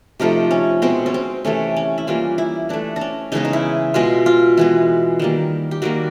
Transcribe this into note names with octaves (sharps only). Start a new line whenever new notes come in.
C3 F3 A3 D#4
C#4
B2 G#3 B3 C4
C#4
C4
C3 E3 A3 C#4
C#4
E4
E3 G3 A#3 F4
E4
E3 A3 D4
D4
C#4
C#3 E3 G#3 B3 D#4
D#4
E4
B2 G#3 B3 F4
F4
E3 G#3 B3
D#3 G3 A#3
G4
D#3 G3 A#3 F#4